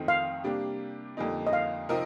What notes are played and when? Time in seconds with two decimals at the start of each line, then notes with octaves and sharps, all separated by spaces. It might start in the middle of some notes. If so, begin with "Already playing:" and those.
Already playing: F2 D#3 A3 C4 D#4
0.08 F5
0.44 C3 G3 A#3 D4 G4
1.17 F2 D3 G3 A#3 D#4
1.47 D#5
1.53 F5
1.89 C3 F3 C4 D#4 A#4